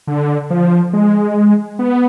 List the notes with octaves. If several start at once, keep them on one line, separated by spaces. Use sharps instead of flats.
D3
F3
G#3
B3